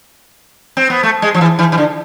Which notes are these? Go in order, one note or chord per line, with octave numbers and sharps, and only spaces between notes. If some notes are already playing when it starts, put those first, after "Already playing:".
C4
B3
A3
G#3
F3
E3
E3
E3
D3